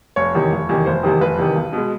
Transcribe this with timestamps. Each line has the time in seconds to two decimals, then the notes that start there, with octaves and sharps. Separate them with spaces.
0.16 F1 C#5
0.35 E2 C3 D#3
0.52 F1
0.69 E2 C3 D#3
0.86 F1 C5
1.03 E2 C3 D#3
1.21 F1 B4
1.38 E2 C3 D#3
1.55 B1
1.73 B2 G#3